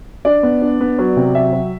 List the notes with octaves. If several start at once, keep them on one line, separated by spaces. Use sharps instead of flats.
D4 D5
B3
D4
B3
F#3
C3
F#3 E5
F#3